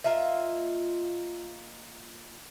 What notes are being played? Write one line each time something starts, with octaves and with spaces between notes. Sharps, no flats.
A#3 F4 D#5 E5